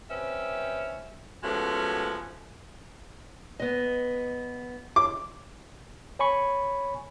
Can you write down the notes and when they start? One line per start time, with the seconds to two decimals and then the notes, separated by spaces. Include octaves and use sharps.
0.10 C3 C4 C#4 B4 E5
1.43 F3 G#3 A3 B3 C#4 F#4
3.60 B3 D#5
4.96 D6
6.19 C#5 G#5 B5 C#6